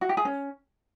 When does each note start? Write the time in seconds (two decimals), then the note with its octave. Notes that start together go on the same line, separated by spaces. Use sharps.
0.01 F#4
0.09 G4
0.17 G#4
0.25 C#4